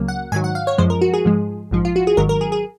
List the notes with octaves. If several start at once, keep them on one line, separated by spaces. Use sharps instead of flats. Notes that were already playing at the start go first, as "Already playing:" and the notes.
Already playing: C#2 C#3 F#3 A#3
F#5
G#2 D#3 F#3 G#5
F#5
F5
C#5
F#2 F3 G#3 C5
A#4
F#4
G#4
G#2 F3 G#3
A#1 G#2 F3
F4
F#4
G#4
G#1 G#2 D#3 F#3 A#4
A#4
G#4
G#4